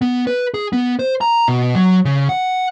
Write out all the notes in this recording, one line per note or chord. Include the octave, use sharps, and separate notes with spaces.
B3
B4
G#4
B3
C5
A#5
B2
F#3
C#3
F#5